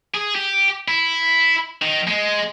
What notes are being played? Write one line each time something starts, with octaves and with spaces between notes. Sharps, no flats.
G#4
G4
E4
D#3
G#3